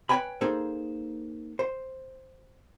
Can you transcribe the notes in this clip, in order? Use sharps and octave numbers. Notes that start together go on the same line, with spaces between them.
B4 C#5 D#5 G5 G#5 B5
A#3 D#4 G#4 A4 C5
C5